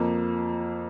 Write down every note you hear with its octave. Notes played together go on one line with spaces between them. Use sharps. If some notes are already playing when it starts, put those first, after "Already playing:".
Already playing: F2 F3 A#3